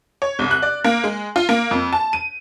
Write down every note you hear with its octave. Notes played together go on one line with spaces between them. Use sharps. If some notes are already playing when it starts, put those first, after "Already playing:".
C#5
C2
F#6
D5
A#3
G#3
F4
A#3
F2
A5
D#7